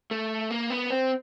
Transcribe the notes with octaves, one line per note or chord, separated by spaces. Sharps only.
A3
A#3
B3
C4